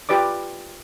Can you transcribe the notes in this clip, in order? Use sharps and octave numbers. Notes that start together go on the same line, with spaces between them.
F4 G4 B4 D5 D6